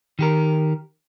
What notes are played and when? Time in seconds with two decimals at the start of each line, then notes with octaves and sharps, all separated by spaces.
0.19 D#3 G4 A#4